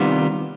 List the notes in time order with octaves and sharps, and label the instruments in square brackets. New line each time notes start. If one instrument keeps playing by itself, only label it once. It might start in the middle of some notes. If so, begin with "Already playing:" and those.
Already playing: [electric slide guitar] C3 D#3 G3 B3 F4